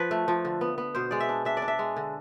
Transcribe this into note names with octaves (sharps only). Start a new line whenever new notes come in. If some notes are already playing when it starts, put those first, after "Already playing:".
Already playing: F3 B4
A3
F3
D3
B3
B3
B2 C5
G#3 D5
E5
D4
D4 E5
D5
D4
E5
G#3
D3